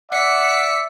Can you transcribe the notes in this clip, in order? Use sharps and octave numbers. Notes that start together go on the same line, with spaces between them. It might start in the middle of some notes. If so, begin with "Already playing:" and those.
D5 E5 F#5 B6 C#7